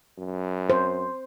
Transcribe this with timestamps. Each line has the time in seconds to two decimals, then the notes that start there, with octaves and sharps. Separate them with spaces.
0.18 F#2
0.70 C5